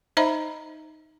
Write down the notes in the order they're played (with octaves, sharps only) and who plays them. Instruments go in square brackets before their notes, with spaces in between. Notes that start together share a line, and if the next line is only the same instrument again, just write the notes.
[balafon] D#4 C5 D#5 E5 A#5 B5